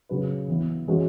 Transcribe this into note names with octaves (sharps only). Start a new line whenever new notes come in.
C#3 F#3 C#4 F#4 B4
E3 B3 E4
E3 G#3 C#4 F#4